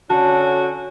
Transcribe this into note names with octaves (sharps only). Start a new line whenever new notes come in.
D3 C#4 F#4 A5